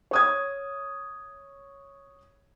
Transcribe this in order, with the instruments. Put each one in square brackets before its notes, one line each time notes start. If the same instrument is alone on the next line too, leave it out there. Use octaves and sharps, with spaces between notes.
[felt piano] C#5 D#6 G#6